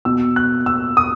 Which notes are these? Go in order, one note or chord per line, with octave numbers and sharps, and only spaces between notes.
B2 E6
F#6
E6
D#6